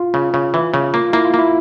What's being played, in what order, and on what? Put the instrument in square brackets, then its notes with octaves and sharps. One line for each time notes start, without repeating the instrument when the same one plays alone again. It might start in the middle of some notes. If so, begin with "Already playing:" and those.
Already playing: [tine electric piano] F4
[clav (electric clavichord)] C#3
C#3
E3
C#3
[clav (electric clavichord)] A#3 [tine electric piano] F4
[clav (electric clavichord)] A#3 [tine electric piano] E4
[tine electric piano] F4
[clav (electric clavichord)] A#3 [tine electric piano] E4